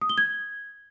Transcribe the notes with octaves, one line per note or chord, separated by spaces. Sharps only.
D#6
G7
G#6